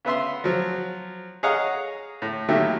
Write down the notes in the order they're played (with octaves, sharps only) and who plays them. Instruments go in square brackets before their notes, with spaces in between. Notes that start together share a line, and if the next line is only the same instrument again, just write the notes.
[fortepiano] C#3 B3 E5 C6
F3 F#3
G#4 C#5 D#5 F5 F#5 A#5
A2
D#3 F#3 A3 A#3 E4 G4